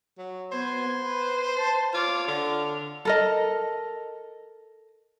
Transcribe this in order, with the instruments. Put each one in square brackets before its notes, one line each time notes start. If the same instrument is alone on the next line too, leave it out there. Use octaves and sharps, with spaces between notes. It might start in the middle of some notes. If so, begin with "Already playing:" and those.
[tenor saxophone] F#3
[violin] B3 G#6 [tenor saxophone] C5
[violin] B4
A5
[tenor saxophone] F4 [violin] C#5 D6
[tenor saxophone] D3 [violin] F6
[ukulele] A4 A#4 D#5